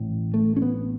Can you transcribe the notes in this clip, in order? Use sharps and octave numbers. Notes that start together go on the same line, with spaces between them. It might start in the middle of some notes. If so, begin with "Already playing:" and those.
Already playing: A1 A2
A3
C#4
B3